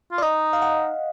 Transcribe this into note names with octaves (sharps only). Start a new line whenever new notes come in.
F4
D5
D#4 D#5
F5
F#5